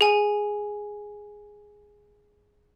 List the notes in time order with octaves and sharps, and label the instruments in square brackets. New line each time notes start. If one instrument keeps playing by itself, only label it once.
[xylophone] G#4 G#5